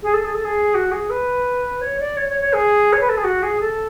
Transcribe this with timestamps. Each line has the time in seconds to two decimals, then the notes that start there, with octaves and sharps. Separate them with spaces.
0.03 G#4
0.14 A4
0.25 G#4
0.34 A4
0.45 G#4
0.75 F#4
0.92 G#4
1.10 B4
1.81 C#5
2.00 D5
2.17 C#5
2.29 C#5
2.41 C#5
2.53 G#4
2.93 C#5
3.01 B4
3.09 A4
3.17 G#4
3.24 F#4
3.43 G#4
3.61 A4